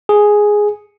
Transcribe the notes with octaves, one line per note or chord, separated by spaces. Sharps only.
G#4